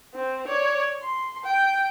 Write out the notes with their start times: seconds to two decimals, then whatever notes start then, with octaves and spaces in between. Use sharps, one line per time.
0.15 C4
0.48 C#5 D5
1.02 C6
1.44 G5